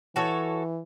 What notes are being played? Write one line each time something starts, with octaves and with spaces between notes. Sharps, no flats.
E3 F#4 A4 C#5